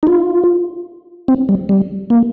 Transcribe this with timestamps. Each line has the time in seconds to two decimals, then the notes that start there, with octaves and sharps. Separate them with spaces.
0.03 D#4
0.07 F4
1.28 C4
1.49 G3
1.69 G3
2.10 A#3